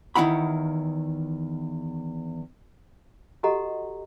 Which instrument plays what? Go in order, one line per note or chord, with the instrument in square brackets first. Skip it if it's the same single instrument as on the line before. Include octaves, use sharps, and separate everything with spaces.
[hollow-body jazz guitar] E2 D#3 B3 E4 F#5 B5
[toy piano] F#4 G4 A4 D#5 F#5 A#5